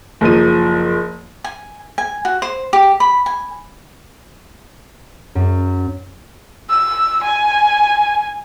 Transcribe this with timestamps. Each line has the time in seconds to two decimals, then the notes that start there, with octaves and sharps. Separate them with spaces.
0.21 F#1 F3 D#7
1.44 G#5
1.98 G#5
2.25 F#4
2.42 C5
2.73 G4
3.00 B5
3.26 G#5
5.35 F#2
6.70 E6
7.23 G#5